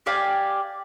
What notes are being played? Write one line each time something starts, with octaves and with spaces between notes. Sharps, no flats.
G4 D5 F5 G#5